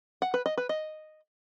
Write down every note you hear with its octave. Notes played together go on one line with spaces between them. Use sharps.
F#5
B4
D#5
B4
D#5